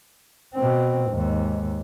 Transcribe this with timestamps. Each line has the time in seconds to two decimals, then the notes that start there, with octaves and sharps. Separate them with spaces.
0.54 B2 C4
1.10 D#2 G#2